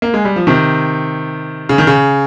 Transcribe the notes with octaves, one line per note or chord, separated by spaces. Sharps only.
A#3
G#3
G3
F3
C3 D#3
C#3
D#3
C#3